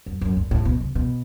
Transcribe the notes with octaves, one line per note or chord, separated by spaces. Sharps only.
F#2
F#2
G2
A2
B2
C#3
B2